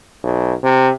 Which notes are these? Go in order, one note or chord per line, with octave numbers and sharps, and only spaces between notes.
B1
C3